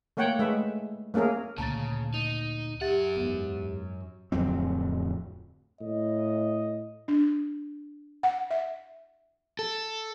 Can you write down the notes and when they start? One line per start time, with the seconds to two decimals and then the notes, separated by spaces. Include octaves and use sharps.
0.17 A3 A#3 C#5 F#5 G5
0.39 G#3 A3 B4 E5
1.14 A3 A#3 C#4 G#4 A#4
1.58 D2 A#2 C#3 A5 A#5 A6
2.14 D#4 F7
2.81 F#2 G4 E5 F#5 A6
3.16 E2 G#2
4.32 D1 F2 F#3 C4
5.81 A2 D#5
7.08 D4
8.23 F#5
8.51 E5
9.59 A4